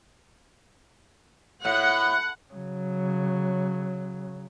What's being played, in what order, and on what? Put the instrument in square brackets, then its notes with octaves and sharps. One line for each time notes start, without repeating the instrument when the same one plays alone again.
[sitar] A2 [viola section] F#5
[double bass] C#3 F#3